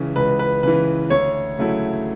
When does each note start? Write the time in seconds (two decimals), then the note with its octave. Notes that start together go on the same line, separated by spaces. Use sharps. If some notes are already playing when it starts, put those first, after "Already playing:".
Already playing: C#2 C#3 E3
0.16 C#2 B4
0.39 B4
0.63 C#3 E3 B4
1.10 D2 C#5
1.59 C#3 F#3 A3 E4